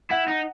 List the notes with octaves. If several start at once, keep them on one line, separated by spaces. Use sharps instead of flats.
E4 F#5
D#4